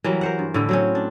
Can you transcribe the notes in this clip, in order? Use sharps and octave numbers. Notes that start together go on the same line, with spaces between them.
E3 F#3 G3 A#4
A#4 C5 F#5
G2
A2 D3 E3
F#3 C4 C#4
D4